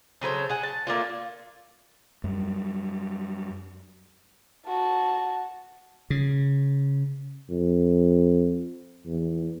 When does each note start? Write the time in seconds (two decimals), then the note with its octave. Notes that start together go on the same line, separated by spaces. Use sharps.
0.21 C#3 F#3 A4 C5
0.49 G#4 F#5
0.63 A5
0.87 A3 A#3 D4 F4
2.24 F#2 G3
4.66 F#4 A5
6.10 C#3
7.50 F2
9.06 E2